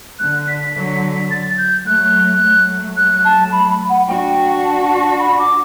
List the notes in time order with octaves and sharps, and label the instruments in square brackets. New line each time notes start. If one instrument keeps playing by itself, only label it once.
[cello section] D3 [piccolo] F#6
[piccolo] B6
[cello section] D3 F#3 [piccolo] B6
[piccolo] A6
G6
[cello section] F#3 A3 [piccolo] F#6
[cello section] F#3 A3
[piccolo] F#6
A5
B5
B5
F#5
[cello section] D4 F#4 [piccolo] G5
[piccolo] A5
A5
A5
B5
D6